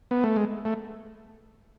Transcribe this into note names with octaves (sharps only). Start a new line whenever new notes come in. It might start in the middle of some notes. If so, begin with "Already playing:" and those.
B3
A3
G#3
A3